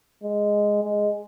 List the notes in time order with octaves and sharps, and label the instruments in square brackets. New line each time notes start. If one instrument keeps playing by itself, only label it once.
[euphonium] G#3
G#3